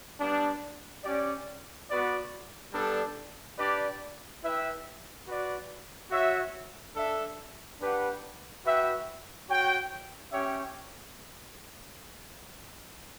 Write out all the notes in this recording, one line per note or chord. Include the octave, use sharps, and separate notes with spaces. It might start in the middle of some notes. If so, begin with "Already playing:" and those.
G3 B3 D4
C#4 G4 D5
B3 F#4 B4 D5
G3 B3 D4 A4
D4 G4 B4 D5
E4 B4 E5 G5
F#4 B4 D5
F#4 C#5 E5
D4 A4 E5
D4 G4 B4 F#5
F#4 B4 E5 G5
F#4 C#5 G5
C#4 G4 C#5 E5 G5